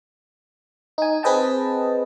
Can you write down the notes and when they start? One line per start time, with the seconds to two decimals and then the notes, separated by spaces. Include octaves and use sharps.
0.98 D#4 G#5
1.23 C4 G#4 B4 D#5 G5 A5